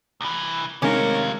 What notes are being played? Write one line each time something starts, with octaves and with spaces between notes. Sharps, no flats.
C2 E3
C3 D#3 G#3 C#4 G4 A#4 F5